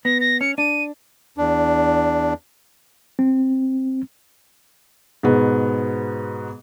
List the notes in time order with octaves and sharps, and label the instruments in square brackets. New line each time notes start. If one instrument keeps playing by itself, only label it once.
[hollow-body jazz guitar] B3 [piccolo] A#6
[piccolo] A#6
[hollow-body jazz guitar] C#4 [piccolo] C#7
[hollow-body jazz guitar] D4 [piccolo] D#7
[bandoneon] E2 D4
[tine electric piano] C4
[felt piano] G#2 B2 B3